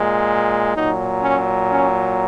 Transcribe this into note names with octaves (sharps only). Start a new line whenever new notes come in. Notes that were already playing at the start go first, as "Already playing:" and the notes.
Already playing: A#2 G#3
A#2 F#3 D#4
C#4
C#4